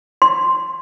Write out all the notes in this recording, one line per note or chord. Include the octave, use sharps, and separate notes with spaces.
C6